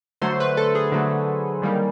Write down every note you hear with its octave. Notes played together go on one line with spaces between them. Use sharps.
D3 F#3 A3 C5
B4
A4
G#4
D3 F#3 A3
D#3 G3 A#3 D#4